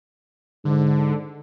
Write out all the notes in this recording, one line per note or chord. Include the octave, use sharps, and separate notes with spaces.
G#2 D3